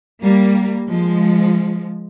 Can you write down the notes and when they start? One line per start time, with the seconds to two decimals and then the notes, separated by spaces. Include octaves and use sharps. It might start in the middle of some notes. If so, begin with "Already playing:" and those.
0.22 G3 A#3
0.87 F3 G#3